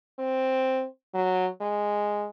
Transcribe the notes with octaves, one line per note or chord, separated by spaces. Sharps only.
C4
F#3
G#3